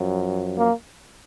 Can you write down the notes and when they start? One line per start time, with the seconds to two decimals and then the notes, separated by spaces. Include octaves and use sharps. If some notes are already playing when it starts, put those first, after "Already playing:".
Already playing: F#2 F3
0.58 A#3